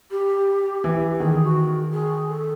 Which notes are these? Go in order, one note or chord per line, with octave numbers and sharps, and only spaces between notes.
G4
E3
D#3 G#4
F#4
G#4
A4